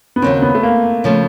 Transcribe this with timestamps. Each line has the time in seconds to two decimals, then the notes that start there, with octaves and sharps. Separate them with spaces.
0.16 B3
0.22 D#2 C#3 F#3 C4
0.42 B3
0.55 A3
0.63 A#3
1.04 C#3 F3 A3